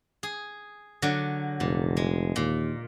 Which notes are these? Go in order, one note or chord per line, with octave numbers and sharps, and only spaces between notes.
G#4
D3 F#3
F1 A#2
G#3
D#2 A#2